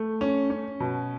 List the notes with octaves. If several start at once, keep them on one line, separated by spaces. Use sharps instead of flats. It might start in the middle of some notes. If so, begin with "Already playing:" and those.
Already playing: A3
C#4
C#4
B2